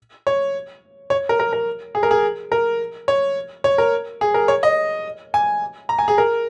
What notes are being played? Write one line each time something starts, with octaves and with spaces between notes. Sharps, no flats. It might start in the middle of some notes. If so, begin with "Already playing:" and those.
C#5
C#5
A#4
A#4
A#4
G#4
A#4
G#4
A#4
C#5
C#5
A#4
G#4
A#4
C#5
D#5
G#5
A#5
G#5
G#4
A#4